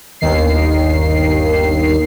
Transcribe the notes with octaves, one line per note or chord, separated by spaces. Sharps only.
G1 D#2 D#3 C7